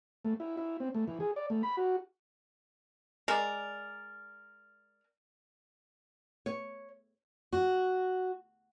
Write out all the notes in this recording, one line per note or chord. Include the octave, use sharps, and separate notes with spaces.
A3
E4
E4
C4
A3
E3
G#4
D5
A3
B5
F#4
G#3 A#4 D5
C#5
F#4